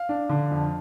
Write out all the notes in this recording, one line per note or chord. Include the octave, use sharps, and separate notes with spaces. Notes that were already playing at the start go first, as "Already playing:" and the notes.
Already playing: F5
D4
D3
F2